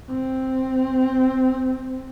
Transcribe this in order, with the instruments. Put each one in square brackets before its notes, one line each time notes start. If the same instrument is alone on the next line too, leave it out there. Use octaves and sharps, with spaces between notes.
[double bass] C4